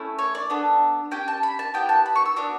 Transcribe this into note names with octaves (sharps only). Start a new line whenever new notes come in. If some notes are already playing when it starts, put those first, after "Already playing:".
Already playing: A3 C#4 E4
C#5
D5
B3 D4 A4
C#4 G4 G5
A5
B5
A5
B3 E4 G4 G5
A5
B5
C#6
E6
B3 D4 F#4 D6